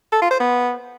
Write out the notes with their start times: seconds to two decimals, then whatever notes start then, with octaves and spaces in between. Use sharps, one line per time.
0.12 A4
0.22 F4
0.31 C5
0.40 B3